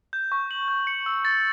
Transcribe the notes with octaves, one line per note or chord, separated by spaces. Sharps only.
G6
C#6
F#7
G6
C#7
E6
A6